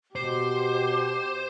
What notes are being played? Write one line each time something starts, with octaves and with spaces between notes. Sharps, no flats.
B2 G4 C5 D6